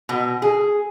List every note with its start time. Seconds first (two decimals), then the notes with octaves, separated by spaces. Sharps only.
0.09 B2
0.42 G#4